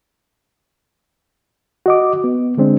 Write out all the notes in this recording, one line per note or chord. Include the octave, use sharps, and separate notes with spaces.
F#4 D#5 D6
B3
D3 G#3 C4 D4